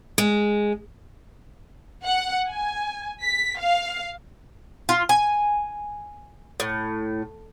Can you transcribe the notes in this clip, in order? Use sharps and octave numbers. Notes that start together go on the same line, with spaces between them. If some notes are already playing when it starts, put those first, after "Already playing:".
G#3
F#5
G#5
B6
F5
F4
G#5
A2